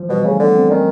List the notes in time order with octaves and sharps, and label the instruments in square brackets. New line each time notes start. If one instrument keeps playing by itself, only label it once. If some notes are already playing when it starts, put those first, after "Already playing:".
Already playing: [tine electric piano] E3 F3
[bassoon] B2 [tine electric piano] G3
[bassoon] C#3 [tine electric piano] A3
[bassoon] D3 [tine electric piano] B3
[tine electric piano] C4
[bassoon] D#3 [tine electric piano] C#4